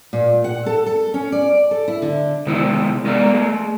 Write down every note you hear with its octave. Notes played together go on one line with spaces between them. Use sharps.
A#2
F#5
A4
A4
C#4
D5
A4
E4
D3
C3 D#3 G#3 B3 E4
G#3 B3 A#4 D5 F5
A3 G#4